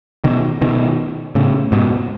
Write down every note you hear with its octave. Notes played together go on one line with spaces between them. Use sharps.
B2 D#3
B2 D#3
A2 C#3
G#2 B2